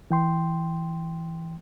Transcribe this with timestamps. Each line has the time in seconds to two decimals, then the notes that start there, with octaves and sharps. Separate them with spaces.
0.11 E3 G5 C6